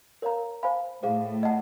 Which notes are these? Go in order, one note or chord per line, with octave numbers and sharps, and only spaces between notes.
A#4 C#5 F5 A#5
C5 F5 G#5 B5
A2 G#4 C5 F5
D#5 F#5 A5